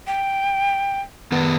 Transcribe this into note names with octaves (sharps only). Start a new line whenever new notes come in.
G5
D#3 B3 B4